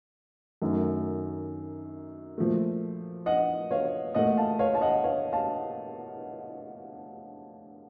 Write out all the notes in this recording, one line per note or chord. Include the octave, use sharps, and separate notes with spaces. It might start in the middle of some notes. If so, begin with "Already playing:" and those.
F#2 D#3 A3
A#2 F3 A3
D#5 F#5
C#5 F5
A#2 A3 D#5 F#5
F5 A5
C#5 F5
A5
D#5 F#5
C#5 F5
F5 A5